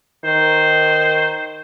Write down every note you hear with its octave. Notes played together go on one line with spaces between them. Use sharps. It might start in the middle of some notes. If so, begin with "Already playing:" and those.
D#3 C5